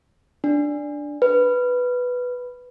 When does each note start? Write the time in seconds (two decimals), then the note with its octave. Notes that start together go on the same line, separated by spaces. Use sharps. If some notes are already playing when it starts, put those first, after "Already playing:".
0.44 D4
1.22 B4